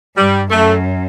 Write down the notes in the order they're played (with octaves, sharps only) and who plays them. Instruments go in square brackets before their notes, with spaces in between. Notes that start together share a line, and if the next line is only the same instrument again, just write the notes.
[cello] G2 [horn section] G3
[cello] F#2 [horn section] A3